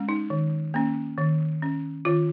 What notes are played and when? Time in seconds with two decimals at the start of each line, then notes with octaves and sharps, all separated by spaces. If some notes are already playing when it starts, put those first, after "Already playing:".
Already playing: G#3 C#4
0.09 D#4
0.30 D#3
0.74 A#3 C#4
1.18 D#3
1.62 C#4
2.05 D#3 F4